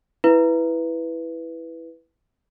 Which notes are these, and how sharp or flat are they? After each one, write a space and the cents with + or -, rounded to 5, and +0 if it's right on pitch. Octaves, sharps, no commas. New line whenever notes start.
E4 +0 B4 +0 E5 +20